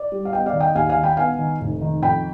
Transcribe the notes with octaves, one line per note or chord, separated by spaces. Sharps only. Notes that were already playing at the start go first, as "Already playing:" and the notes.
Already playing: D5
G3
F5
B3 D#5 G5
D5 F5
D#3
D#5 G5
D#2 F5 G#5
F5 G#5
D#3
G5 B5
B3 F5 G#5
D#3
F1
D#3
F2 G5 B5